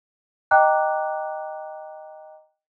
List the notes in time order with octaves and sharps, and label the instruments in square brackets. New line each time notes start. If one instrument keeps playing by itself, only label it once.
[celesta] D#5 G5 A#5 D6 F#6